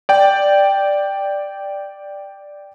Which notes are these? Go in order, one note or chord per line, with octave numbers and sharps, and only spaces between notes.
D5 G5